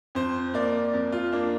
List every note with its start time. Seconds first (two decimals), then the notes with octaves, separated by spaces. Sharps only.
0.15 F2 C5
0.54 A#3 D5
0.93 F2
1.12 F4
1.32 A#3 D4